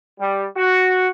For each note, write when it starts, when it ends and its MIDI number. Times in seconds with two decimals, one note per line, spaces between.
0.19 0.45 55
0.56 1.07 66